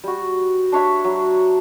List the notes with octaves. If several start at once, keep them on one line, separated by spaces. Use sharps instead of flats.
G3 F#4
D4 C#5 E5 B5
F#3